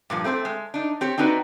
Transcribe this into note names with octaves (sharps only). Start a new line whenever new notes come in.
G2 A#2 F3
A3 C4 G4 C5
G#3
D4 D#4
C4 G4 C#5
C4 D4 D#4 F#4 B4